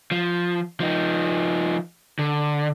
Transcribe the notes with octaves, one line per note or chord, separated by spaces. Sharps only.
F3
F3 D#4
D3